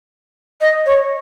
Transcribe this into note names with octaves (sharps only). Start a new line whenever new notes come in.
D#5
C#5